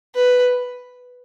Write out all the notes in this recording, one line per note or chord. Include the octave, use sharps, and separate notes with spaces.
B4